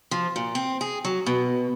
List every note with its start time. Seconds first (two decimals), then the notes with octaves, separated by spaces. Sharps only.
0.11 F3
0.36 A#2
0.55 C4
0.81 G#4
1.05 F#3
1.26 B2